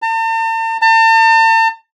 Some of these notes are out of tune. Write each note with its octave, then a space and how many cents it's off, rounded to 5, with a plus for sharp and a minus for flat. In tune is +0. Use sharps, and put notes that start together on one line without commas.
A5 +45
A5 +40